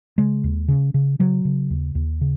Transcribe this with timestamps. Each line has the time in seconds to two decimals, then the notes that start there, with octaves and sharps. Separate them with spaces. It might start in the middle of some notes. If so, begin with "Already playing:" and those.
0.18 C#3 G#3
0.44 D#2
0.68 C#3
0.94 C#3
1.19 C#3 F#3
1.45 C#3
1.70 D#2
1.95 D#2
2.21 C#3